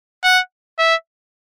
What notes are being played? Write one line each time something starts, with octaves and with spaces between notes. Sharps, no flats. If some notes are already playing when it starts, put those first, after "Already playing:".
F#5
E5